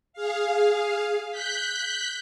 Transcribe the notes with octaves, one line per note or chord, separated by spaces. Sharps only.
G#4 F5
F#6 G6 B6